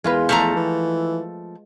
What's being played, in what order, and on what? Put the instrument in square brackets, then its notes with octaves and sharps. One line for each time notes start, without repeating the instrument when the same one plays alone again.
[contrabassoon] E2 [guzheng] G#3 F4 B4
[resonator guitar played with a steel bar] F3 A3 A#5
[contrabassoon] E3